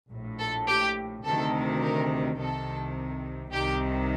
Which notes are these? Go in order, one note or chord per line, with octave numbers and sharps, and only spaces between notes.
A#1 A2
A4
G4
D2 C3 D#3 A4
A#4
C2 C3 D#3 A4
C2 C3 D#3 G4